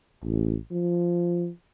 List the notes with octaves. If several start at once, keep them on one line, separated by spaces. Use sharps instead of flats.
A1
F3